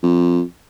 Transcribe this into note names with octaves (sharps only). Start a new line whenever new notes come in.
F2